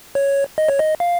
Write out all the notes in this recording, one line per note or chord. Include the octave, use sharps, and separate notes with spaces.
C#5
D#5
C#5
D#5
F5